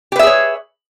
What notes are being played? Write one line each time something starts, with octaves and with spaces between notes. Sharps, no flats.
G4 G#4 B4 C#5 E5